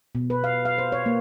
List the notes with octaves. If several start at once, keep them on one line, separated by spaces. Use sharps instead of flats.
B2
B4
F5
F5
C5
C#5
A#3